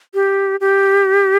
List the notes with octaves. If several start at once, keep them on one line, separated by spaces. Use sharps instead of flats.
G4
G4